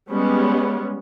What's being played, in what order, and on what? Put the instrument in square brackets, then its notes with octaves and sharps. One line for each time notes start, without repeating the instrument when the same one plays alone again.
[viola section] G3 G#3 B3 C#4